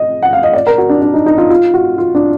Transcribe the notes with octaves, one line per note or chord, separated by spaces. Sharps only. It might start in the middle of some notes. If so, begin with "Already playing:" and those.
Already playing: D#5
F#5
F5
D#5
D5
A#4
F#4
D4
D4
D#4
D#4
F4
F4
F#4
F4
D4